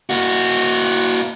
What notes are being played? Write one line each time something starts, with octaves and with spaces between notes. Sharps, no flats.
A#3 F#4